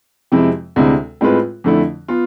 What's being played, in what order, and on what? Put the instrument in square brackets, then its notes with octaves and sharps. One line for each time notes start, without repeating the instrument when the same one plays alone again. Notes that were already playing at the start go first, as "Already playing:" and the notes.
[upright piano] F2 C3 G#3 C4 E4
D2 C3 G#3 C4 E4
A2 G#3 C4 F4 B4
F2 D3 A3 E4
B3 F4